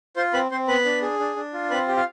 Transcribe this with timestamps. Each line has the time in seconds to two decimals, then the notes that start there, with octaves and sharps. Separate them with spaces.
0.16 F4 C5 C6
0.34 C4 B4 B5
0.51 C4 C5 C6
0.68 B3 B4 B5
0.85 D4
1.02 G#4
1.19 D4
1.36 D4
1.54 F4
1.70 C4 B4 B5
1.88 G4
1.96 F4 F5